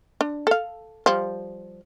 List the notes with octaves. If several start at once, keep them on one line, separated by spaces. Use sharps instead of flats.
D4
A4 F5
F3 G3